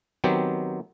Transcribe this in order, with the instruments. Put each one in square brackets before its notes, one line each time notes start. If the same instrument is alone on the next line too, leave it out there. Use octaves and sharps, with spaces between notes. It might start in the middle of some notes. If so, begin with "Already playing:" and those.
[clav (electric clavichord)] D#3 F#3 B3 C4 G4